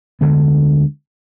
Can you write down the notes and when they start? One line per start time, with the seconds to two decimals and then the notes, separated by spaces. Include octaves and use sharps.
0.21 D2 D3 G#3 B3